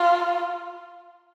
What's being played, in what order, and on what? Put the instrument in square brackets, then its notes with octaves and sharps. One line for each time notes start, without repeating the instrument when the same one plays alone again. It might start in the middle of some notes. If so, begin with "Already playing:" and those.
Already playing: [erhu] F4